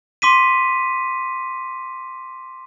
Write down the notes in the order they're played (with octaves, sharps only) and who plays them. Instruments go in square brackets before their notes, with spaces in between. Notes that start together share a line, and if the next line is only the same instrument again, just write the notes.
[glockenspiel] C6 D6 B6 D#7